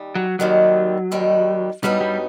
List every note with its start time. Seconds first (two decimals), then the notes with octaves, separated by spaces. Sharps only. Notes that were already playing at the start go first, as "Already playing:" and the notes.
Already playing: D#2 G3
0.15 F#3
0.39 D#2 D#3 F#3 G3
1.12 D#2 D#3 G3
1.83 G2 F#3 G3 B3 D#4
2.01 G3